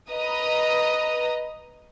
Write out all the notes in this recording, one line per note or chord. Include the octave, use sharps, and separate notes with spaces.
B4 D#5 A#5 D#6